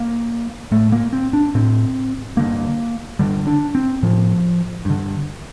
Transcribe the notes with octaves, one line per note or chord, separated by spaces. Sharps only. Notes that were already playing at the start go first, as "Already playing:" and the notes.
Already playing: A#3
A2 A3
A#3
C4
D4
A2 C4
G2 D3 A#3
G2 D3 G3
D4
C4
A2 F3
G2 D3